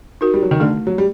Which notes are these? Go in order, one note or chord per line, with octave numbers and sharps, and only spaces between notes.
D#4 F#4 A#4
G3
F#3
D#3
D3 A3
F#3
G3